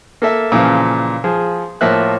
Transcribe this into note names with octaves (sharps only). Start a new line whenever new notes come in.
A#3 A4 E5
A#2 C#3 E3 F3
F3 G#4
A2 F3 A#3 E5 F#6